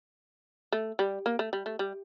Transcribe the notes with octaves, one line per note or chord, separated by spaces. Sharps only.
A3
G3
A#3
A3
G3
A3
G3